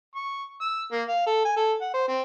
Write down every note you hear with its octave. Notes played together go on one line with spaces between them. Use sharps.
C#6
E6
A#3
F5
A4
G#5
A4
F#5
C5
C4